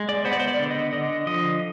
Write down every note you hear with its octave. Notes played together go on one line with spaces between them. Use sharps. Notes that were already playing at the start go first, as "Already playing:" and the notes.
Already playing: G#3
D5
B3 C5
D5
C5
D5
D3
D#5
D3 D#5
F3 D#5